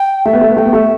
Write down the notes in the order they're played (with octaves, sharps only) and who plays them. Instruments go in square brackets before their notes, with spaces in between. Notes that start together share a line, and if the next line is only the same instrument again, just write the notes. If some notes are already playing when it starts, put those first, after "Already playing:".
Already playing: [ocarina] G5
[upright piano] A3 [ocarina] E5
[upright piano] B3
A3
B3
[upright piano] A3 [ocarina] G5
[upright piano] B3
[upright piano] A3 [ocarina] E5